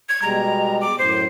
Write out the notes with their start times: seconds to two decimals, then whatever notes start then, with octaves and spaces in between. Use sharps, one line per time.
0.09 G#6
0.22 B2 G3 G#3 A#5
0.81 D6
0.99 F#2 A2 C5